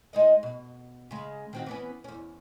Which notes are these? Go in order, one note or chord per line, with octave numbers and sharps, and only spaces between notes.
G#3 D#4 D#5
B2
C#3 G#3
D#3 C4 F#4
E3 B3 C#4
E2 C#4